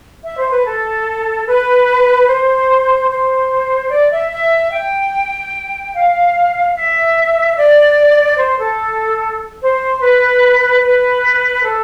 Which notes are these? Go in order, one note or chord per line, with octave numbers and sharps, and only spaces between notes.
E5
C5
B4
A4
B4
C5
C5
D5
E5
E5
G5
F5
E5
D5
C5
A4
C5
B4
B4
A4